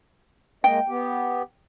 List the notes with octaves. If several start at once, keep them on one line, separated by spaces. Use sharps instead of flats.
G#3 A#3 D#5 G5
B3 G4